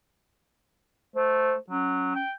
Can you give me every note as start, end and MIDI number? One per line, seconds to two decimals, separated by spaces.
1.16 1.54 57
1.16 1.57 72
1.70 2.14 54
1.70 2.21 61
2.15 2.31 79